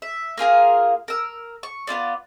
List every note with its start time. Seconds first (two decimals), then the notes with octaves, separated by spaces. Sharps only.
0.02 E5
0.37 A#3 F4 G#4 A#4
1.08 A#4 E6
1.63 C#6
1.87 B3 C#4 F4 D5